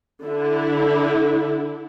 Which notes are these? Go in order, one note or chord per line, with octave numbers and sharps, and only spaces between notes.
D3 E4